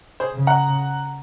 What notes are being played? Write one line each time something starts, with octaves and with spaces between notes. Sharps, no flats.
G#4 C5
C#3
F#5 A#5